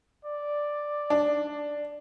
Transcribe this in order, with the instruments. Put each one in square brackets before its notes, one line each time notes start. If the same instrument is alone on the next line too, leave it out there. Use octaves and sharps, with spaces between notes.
[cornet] D5
[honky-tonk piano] D4